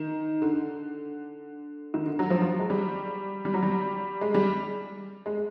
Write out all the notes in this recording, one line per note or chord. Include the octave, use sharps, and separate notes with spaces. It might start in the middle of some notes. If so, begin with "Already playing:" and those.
Already playing: D#3
D3
D#3
D3
F#3
F3
F#3
G#3
G3
G3
F#3
G3
G#3
G3
G#3